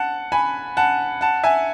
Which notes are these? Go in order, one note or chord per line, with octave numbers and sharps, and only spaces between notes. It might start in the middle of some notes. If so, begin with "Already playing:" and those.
Already playing: F#5 A5
G#5 B5
F#5 A5
F#5 A5
E5 G#5